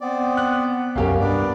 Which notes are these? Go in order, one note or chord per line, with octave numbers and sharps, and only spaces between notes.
B3 C4 D5
F#6
C2 F#2 A#3 C#4 G4 A#4
G2 B3 D4 D5